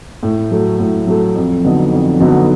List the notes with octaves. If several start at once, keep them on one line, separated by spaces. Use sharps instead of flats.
A2
F#3 A3
A2
F#3 A3
F2
D3 F#3 B3 D#4
F2
D3 F#3 B3 D#4